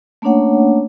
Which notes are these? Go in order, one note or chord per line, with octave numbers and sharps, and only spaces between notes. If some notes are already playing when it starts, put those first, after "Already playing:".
A3 A#3 C#4 D4 C#5 F#5